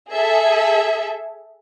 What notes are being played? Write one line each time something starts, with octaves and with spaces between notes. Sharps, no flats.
G#4 A4 E5